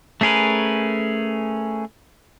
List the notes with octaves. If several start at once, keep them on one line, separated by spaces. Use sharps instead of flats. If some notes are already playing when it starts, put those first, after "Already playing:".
A3 C#4 G#4 A#4 B4